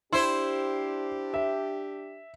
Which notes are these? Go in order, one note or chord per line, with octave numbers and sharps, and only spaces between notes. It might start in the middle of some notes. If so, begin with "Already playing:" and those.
D4 E4 G4 C5 C6
E5